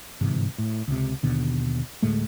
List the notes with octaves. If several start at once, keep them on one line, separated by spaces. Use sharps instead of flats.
G1 G#2 C3 E3
A2
C#2 C3
D#2 B2 D3
D2 A2 G#3 A3